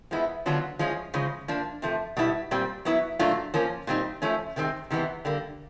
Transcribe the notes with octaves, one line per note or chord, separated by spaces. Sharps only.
F3 G#3 B3 E4
D3 F#3 B3 D4 F4
F3 G#3 C#4 F4
C#3 F3 G#3
F3 A#3 D4
C3 F3 A3
B2 G3 B3 E4
A#2 G3 C4
F#3 B3 E4
A#2 F#3 A3 D4 F4
F3 A#3 C#4
A#2 G3 C4 D#4
F3 A3 C#4
C3 D#3 G#3 C4
C3 E3 G#3 B3
D3 G3 A#3